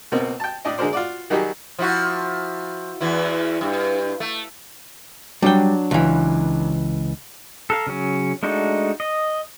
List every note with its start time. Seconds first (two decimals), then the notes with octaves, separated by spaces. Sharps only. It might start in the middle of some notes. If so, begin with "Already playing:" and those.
0.12 C#2 B2 A#3 C4
0.40 G5 A5
0.65 A2 D4 D5 D#5
0.78 D3 G#3 G#4 A#4 C5 D5
0.93 F4 F#4 D5
1.30 D#3 F#3 G3 D#4 G4 G#4
1.79 F3 E4 F#4
3.01 E2 E3 E4
3.61 G2
4.20 A3
5.42 F#3 G3 D4 G5
5.91 C#2 E3
7.70 A4 A#4 F5
7.87 C#3 F#3 C#4
8.43 G#3 A3 D4 D#4 F#4
9.00 D#5